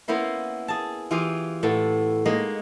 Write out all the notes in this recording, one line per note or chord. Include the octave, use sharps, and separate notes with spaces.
A#3 B3 C#4 E4 C5
G#4 A5
E3 F4 G4 G#4 F5 G#5
A2 B3 A5
G#3 A#3 D#4